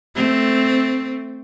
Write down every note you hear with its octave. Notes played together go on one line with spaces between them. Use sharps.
A3 C4